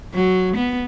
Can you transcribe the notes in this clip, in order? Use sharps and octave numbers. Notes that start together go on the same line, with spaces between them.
F#3
B3